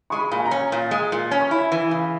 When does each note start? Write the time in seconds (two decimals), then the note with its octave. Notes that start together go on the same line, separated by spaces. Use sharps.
0.10 G#3 C#6
0.18 B5
0.32 A#2
0.39 G#5
0.45 A#5
0.51 C#4
0.72 A#2
0.91 G#3
1.12 A#2
1.31 C#4
1.40 C#6
1.51 E4 B5
1.72 E3
1.91 C#3